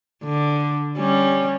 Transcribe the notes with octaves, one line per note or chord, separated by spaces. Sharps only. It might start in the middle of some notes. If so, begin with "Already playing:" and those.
D3
G3 C#4